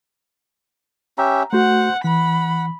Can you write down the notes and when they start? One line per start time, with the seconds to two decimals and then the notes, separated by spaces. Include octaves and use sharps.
1.18 C#4 G4 E5 A#5
1.53 A3 F#4 C5 F#5
2.04 E3 F#5 B5